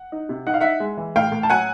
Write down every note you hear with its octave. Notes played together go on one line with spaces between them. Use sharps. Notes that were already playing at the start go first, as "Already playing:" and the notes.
Already playing: F#5
D#4
C3
D#4 F#5
F5
D#4 E5 F#5
G#3
E3
A2 F5 G5
A2
A5
F#3 F#5 G#5